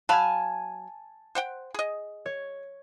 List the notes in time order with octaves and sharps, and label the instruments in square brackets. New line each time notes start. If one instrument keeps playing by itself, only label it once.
[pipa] F#3 F5 B5 [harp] G#5 A5
[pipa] C5 F#5 G5
G#4 D#5
[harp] C#5